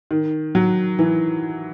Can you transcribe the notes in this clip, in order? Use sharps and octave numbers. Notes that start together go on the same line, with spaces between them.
D#3
F#3
E3